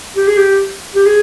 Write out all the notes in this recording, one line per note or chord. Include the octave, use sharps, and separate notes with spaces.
G4
G#4
G4
G4
G#4